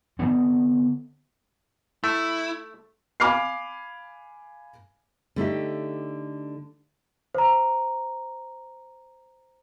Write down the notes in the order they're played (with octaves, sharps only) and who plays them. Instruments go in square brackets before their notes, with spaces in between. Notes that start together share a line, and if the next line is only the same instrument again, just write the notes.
[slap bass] D3 F3 B3 C4
[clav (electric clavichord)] A3 [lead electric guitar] E4
[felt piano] F5 G#5 B5 D6 F6 C7
[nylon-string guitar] D3 A3 D#4 G4
[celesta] C5 A#5